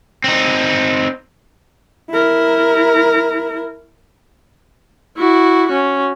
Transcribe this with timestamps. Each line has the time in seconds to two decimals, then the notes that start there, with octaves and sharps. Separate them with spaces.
0.24 C4 D#4
2.12 E4 A#4
5.18 E4 F#4
5.68 C#4 F#4